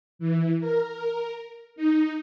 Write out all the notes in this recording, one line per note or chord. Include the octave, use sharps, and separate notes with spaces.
E3
A#4
D#4